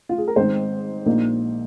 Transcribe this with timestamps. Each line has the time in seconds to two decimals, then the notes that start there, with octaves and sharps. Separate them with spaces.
0.09 F4
0.18 G#4
0.28 A#4
0.36 G#2 D#3 C4 D#4 C5
1.06 A#1 A#2 A#3 D#4